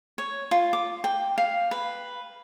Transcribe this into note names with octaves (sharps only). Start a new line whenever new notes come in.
C#5
F4
D6
G5
F5
B4